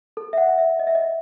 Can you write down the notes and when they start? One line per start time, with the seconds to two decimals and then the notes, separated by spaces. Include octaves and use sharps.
0.17 A4
0.33 E5
0.38 F#5
0.58 E5
0.79 D#5
0.87 E5
0.95 D#5